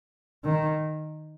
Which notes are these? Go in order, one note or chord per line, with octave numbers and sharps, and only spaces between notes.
D#3